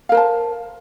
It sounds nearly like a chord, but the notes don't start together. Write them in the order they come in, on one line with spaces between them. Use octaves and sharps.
F5 A#4 C5 A5